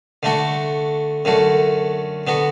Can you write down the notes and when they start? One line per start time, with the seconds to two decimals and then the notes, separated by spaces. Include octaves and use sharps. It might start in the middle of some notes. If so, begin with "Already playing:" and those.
0.23 D3 A3 D4 F#4
1.25 F#2 D3 A3 F#4
2.27 D3 B3 F#4